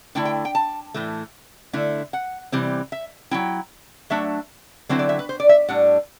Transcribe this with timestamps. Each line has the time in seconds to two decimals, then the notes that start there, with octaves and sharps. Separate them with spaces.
0.15 D3 A3 E4 G5
0.25 G5
0.45 G5
0.55 A5
0.94 A2 E3 A3
1.73 D3 A3 E4
2.13 F#5
2.52 C3 E3 G3 C4
2.92 E5
3.31 F#3 C4 E4 G5
4.10 F#3 A3 D4 E5
4.89 D3 F#3 C4 E4 C5
4.99 D5
5.09 E5
5.19 B4
5.29 C5
5.40 D5
5.49 E5
5.68 A2 G3 D4 F#5